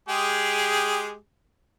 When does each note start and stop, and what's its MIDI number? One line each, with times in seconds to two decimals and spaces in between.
0.09 1.15 56
0.09 1.15 67
0.09 1.15 68